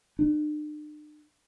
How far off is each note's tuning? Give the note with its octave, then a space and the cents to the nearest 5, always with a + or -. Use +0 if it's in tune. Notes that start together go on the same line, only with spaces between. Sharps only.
D4 +45